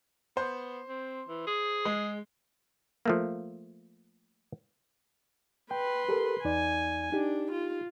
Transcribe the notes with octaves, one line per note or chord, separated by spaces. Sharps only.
B3 C5
C4
E3
G#4
G#3
F3 A3 A#3
B4 G5 C6
G4 A4 A#4
E2 D#4 D5 G#5
D4 D#4 G4
F4